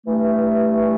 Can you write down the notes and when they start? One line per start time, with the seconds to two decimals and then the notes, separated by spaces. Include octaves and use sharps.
0.06 G2 E3 A3